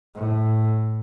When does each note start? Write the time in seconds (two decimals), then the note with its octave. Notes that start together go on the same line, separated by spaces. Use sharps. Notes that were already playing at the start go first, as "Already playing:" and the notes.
0.15 A2